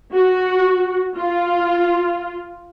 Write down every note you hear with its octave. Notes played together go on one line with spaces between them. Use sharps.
F#4
F4